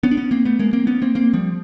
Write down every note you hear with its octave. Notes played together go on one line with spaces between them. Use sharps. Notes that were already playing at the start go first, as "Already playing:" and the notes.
B3 C#4
D4
B3 C#4
A#3 C4
A3 B3
G#3 A#3
A#3 C4
B3 C#4
A#3 C4
A#3 C4
F3 G3